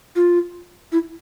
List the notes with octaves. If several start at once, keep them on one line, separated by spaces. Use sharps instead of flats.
F4
E4